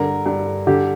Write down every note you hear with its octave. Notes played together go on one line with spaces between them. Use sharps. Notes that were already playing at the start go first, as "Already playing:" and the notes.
Already playing: G2 D3 A#4
G2
D3 G4